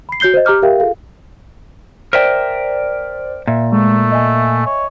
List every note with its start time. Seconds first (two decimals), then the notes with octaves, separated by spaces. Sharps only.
0.09 B5 C7
0.20 F#4 C#5 G6 C7 G7
0.34 C5 D#5
0.45 G4 A#5 D6 F6 G6
0.62 G4 A#4 E5 F5 G5
0.80 F4 G#4 A4 F5
2.13 A#4 C5 D5 E5 G5
3.47 A#2 E5
3.72 G#3 A3
4.12 D#5 E5 G#5
4.66 C#5